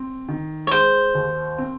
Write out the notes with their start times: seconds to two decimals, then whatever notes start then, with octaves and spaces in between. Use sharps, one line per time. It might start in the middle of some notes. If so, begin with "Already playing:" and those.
Already playing: C4
0.28 D#3
0.67 C#5
0.71 G#3 C5
1.15 D#2
1.58 C4